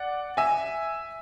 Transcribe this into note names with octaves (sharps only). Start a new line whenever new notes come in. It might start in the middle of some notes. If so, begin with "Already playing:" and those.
Already playing: D5 F#5
E5 G#5